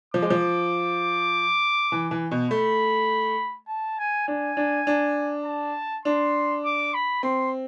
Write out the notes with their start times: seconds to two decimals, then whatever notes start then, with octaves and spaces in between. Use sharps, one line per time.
0.14 F3 D6
0.22 G#3
0.30 F3
1.92 E3
2.11 E3
2.31 B2
2.50 A3 B5
3.68 A5
3.98 G#5
4.28 D4 G#5
4.57 D4
4.87 D4
5.45 A5
6.05 D4 C6
6.65 D6
6.94 B5
7.23 C4 C6